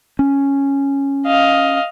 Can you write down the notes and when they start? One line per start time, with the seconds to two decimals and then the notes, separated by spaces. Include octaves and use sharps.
0.19 C#4
1.27 D#5 F5